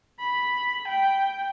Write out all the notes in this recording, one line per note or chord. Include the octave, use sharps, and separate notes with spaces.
B5
G5